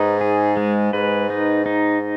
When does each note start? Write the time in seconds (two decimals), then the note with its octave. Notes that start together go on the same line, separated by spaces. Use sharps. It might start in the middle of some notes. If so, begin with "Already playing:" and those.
Already playing: G#2 D#4 B4
0.21 G#4
0.57 G#3
0.93 G#2 B4
1.30 D#4
1.66 D#4